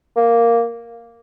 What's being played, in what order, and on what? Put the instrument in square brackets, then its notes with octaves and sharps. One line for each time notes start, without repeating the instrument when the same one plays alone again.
[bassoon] A#3